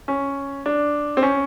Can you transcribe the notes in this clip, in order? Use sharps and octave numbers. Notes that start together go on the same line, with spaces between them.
C#4
D4
C4
C#4